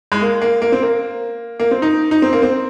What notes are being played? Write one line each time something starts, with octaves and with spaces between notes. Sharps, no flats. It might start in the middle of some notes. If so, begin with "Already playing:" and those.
G#3
A#3
A#3
A#3
C4
A#3
A#3
C4
D#4
D#4
C4
A#3
C4